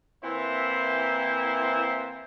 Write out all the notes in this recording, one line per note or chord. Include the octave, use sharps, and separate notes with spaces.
E3 A#3 C4 E4 C5 E5